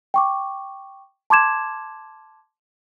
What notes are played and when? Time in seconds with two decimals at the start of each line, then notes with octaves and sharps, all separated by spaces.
0.14 G5 C#6 D6
1.30 A5 C6 D6 G#6 E7